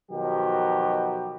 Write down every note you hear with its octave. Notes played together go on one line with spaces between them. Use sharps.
B2 D#3 F3 F#3 G4